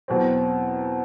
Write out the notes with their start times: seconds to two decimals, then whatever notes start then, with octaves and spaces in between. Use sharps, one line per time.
0.08 E2 B2 F#3 C4